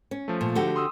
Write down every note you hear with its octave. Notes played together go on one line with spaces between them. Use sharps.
C#4
F3 A3
A#2
D3 F#4 G4
C6 D#6 E6